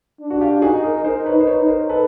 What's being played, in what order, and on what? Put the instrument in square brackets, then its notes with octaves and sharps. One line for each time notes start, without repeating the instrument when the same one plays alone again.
[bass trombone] D4
[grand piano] F#4
F4 G4
[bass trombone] D#4 [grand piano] F#4 G#4
[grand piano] G#4 A#4
[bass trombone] D#4 [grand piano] A#4 C5
[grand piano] B4 C#5
[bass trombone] D#4
[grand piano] C5
B4 C#5
[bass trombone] D#4
[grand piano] A#4 C5
A4 B4